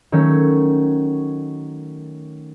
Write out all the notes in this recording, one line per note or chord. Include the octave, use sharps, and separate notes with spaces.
D#3 F#3 A3 C#4